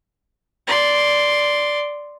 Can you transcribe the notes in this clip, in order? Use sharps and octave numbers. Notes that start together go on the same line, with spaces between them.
D5 C6